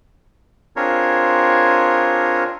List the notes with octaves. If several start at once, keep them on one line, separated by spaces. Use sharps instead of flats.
C4 D4 F4 G#4 A#4 C#5